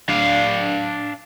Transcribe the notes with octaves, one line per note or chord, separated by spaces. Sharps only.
D4 F5